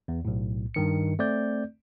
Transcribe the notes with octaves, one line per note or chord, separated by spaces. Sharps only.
E2
B1 A2
G2 D#3 C#7
A3 C4 D5 G6